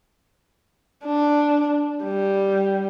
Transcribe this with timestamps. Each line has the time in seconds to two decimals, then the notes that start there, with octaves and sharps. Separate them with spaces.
1.04 D4
2.04 G3